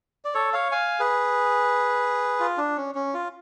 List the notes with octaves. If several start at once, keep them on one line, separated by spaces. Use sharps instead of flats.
D5
A4 C#5
C#5 F5
F5 G#5
G#4 B4
F4
D4
C#4
C#4
F4